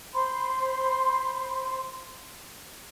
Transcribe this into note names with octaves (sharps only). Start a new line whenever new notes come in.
C5 B5 C6